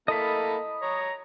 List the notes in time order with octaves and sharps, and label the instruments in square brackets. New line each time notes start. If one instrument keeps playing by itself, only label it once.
[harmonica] A#3 E4 A4 [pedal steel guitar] D#5 B5
[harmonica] C#5 A#5